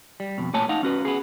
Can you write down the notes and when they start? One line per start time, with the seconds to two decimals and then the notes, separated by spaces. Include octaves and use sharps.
0.20 G3
0.38 F2 B2
0.54 A#2 A3 C#5 G#5 A5
0.69 D#4 F5 F#5
0.83 C#4 F#4 B4
1.05 B3 G#4